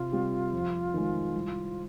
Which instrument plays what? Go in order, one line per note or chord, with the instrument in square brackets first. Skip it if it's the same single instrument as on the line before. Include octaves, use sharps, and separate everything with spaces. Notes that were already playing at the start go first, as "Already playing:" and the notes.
Already playing: [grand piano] C3 [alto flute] F4
[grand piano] G3 C4 G4
F2
D#3 G#3
C2